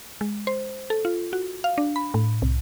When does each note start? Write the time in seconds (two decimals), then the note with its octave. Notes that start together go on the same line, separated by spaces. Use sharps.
0.21 G#3
0.47 C5
0.90 A4
1.05 F4
1.33 F#4
1.64 F5
1.78 D4
1.96 B5
2.14 A2
2.42 C2